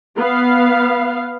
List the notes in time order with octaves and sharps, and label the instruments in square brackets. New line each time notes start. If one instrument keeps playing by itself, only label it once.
[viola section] B3 F5